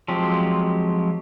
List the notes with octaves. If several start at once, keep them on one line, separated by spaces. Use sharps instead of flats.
F3 F#3 G#3 C4 G4